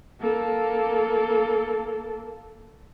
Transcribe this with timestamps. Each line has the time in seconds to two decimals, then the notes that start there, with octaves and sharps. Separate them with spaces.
0.21 A#3 A4